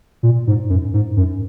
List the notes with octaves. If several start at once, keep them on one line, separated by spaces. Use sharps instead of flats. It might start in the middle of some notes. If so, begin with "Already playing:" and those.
A#2
G#2
F#2
G#2
F#2